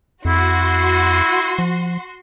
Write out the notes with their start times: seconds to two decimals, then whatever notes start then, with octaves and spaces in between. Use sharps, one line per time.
0.25 F2 E4 F#4 C6
1.58 F3